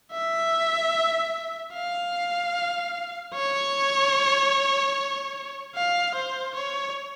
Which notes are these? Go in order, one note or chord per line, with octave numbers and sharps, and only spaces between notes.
E5
F5
C#5
F5
C5
C#5